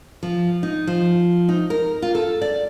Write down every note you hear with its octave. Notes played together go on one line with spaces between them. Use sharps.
F3
D#4
F3
D#4
A#4
F4
A4
D5